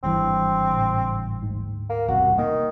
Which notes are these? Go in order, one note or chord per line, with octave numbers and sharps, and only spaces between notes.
G#1 G2 E3 C4
A2 C#3
D2 G#2
A#3
E1 C2 C3 F#4
D#3 A#3